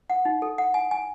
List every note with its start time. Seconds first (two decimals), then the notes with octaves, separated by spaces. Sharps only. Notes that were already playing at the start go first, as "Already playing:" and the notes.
0.10 F#5
0.25 D#4
0.42 A4
0.58 F#5
0.74 G#5
0.91 G#5